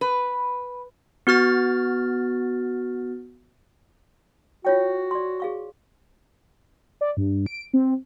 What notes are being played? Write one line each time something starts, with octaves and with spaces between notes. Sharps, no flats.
B4
B3 F#4 F6 A6
F4 F#4 C#5 G5
D5 C6
G#4 F5 C#6
D5
G2
D7
C4